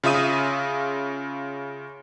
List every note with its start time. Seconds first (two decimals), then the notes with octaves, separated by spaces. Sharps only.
0.03 C#3 F4 E5 D#6 D#7